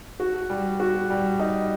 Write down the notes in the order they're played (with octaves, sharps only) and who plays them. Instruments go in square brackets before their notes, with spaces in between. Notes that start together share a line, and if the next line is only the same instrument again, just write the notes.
[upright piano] F#4
G3
F#4
G3
D#4